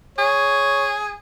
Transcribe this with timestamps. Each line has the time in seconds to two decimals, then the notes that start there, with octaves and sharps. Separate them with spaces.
0.18 G#4 C#5